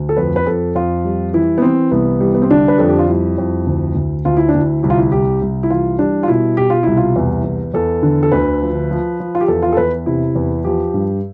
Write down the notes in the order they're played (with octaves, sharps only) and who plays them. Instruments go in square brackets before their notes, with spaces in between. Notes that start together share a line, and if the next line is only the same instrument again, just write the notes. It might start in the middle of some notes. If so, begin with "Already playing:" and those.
Already playing: [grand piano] D2
A4
F2 B4
B4
F2 A4
F2 F4
G3
E3 E4
B3
E3 C4
C2 B3
G3
B3
C4
D3 D4
B4
F2 A4
G4
F4
G3 E4
F2
D2
D2
D2 F4
E4
D4
D2 E4
C2 E4
F4
E4
C2 G4
C2
E4
E3 F4
G3 D4
F4
B2 E4
B2 G4
F4
C2 E4
F4
E2
E2
E2 A4
D3
A4
D2 B4
F3
F3
F3
F4
G4
E2 A4
F4
A4
E2 B4
C3 E4
E2
F3 G4
G2